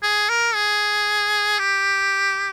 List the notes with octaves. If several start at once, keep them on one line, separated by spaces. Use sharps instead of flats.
G#4
A#4
G#4
G4